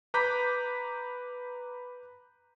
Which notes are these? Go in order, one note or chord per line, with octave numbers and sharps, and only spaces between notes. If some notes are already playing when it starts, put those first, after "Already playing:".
B4 A#5 D6 G6 B6